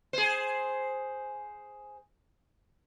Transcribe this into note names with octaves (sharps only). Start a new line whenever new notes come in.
G#4 C5